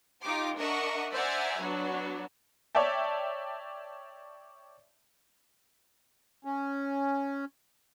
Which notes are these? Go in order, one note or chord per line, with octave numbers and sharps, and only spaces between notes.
D#4 F4 G4 C6 D6
D4 A#4 D#5 E5 F#5 C#6
C5 D5 E5 F#5 G#5 A#5
F#3 B3 D4 F#4
C#5 D5 E5 G5 A5
C#4